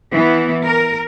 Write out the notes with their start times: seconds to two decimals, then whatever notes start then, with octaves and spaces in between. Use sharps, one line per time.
0.11 E3 B3
0.65 A#4